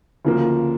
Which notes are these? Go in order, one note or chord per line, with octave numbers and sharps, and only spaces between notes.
D2 C#3 F3 A#3